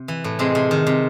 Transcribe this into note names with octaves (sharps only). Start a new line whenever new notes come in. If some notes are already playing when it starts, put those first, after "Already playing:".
Already playing: C3
E3
A2
C3 G#3 C4
C3
D#3
C3